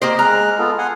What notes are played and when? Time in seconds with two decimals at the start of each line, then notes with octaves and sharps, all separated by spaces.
0.02 A#3 G4 C5 D#5
0.19 G#3 A#5 F6 F#6
0.59 B3 F4 A4
0.78 F#5 G#5 C6